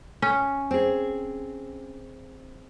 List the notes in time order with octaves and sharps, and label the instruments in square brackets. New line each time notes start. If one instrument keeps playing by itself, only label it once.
[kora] C#4
[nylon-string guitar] C4 G#4